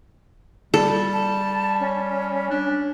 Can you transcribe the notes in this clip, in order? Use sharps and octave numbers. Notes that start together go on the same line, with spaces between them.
G3 A4
A5
C#4
D4